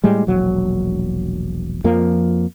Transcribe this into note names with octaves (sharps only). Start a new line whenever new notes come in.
A2 G3 G#3
E1 A#1 F#3
F2 F3 A#3